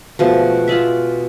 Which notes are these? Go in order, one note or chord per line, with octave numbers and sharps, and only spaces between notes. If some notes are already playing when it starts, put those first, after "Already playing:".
B2 F3 G#3 A3
F4 G#4 D5 E5